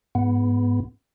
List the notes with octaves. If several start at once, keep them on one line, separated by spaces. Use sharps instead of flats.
G#2 B3